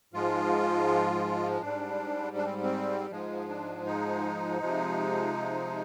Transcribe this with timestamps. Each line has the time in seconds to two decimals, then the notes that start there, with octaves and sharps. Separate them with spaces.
0.13 G#2 F3 G#3 F4
1.62 G#2 D4
1.67 G3
2.37 D4
2.45 C4
2.63 C4
3.11 G#2 F3 G#3
3.49 D4
3.86 D#4
4.60 C3 F3 G#3